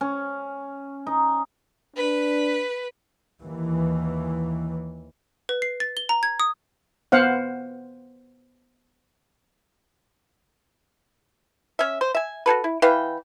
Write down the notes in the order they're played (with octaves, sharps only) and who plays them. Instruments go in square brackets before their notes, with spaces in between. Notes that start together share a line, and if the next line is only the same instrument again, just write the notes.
[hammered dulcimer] C#4
D#4
[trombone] D4 [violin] B4
[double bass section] D#2 E3
[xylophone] B4
C7
A6
G7
A#5
G#6
D#6
[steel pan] B3 C5 F5 F#5
[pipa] C#4 E5
C5
E5 G#5
F#4 G#4 A4 B4
E4
E3 B4 F5 G5